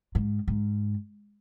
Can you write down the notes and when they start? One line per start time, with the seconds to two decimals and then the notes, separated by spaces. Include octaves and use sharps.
0.15 G#2
0.48 G#2